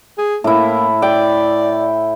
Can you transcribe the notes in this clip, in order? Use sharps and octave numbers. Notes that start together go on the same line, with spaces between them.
G#4
A2 A#3 E4
D5 G5